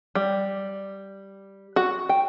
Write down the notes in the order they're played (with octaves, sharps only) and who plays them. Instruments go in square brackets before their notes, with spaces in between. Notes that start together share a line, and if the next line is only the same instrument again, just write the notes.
[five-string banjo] G3
F#4
G5